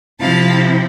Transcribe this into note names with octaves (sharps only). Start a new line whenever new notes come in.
C3 F3 C4 E4 F5 A5